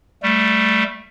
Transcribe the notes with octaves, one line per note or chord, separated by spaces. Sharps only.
G3 A3